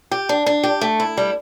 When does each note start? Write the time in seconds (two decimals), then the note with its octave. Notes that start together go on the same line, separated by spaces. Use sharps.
0.11 G4
0.29 D4
0.46 D4
0.63 G4
0.81 A3
1.00 E4
1.17 G3